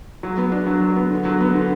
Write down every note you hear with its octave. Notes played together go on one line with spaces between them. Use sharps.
F#3
B3
D4
F#3
F#3
B3
D3
F#3
B3
D3